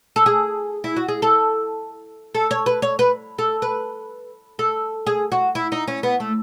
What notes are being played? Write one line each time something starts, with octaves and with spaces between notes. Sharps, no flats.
A4
G#4
E4
F#4
G#4
A4
A4
C#5
B4
C#5
B4
A4
B4
A4
G#4
F#4
E4
D#4
C#4
B3
A3